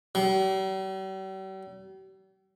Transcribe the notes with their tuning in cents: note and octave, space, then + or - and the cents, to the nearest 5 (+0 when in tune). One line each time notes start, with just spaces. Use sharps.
G3 -45